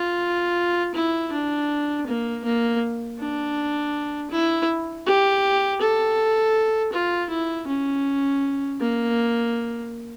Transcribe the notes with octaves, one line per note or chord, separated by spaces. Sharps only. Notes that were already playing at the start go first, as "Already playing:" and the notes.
Already playing: F4
E4
D4
A#3
A#3
D4
E4
G4
A4
F4
E4
C#4
A#3